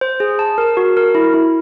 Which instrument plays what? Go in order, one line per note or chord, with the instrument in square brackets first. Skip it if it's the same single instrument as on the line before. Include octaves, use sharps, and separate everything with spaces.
[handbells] C5
G#4
A5
A#4
F#4
A#4
E4
E4